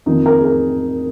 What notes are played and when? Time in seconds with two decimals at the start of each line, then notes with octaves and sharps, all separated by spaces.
0.06 F2 D#3 A#3 D#4
0.26 A#4
0.40 G#4
0.45 A#4